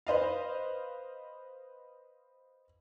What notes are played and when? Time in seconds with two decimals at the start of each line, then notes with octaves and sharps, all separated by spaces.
0.07 B4 C5 D#5 F5